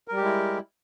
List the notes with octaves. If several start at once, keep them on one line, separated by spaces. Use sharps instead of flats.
G3 G#3 E4 G4 A#4